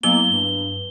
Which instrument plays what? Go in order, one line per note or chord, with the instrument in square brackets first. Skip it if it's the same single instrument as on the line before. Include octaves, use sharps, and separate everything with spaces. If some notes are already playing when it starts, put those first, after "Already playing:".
[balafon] F#3 B3 E4 [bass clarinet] A#3 [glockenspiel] G7
[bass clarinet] G2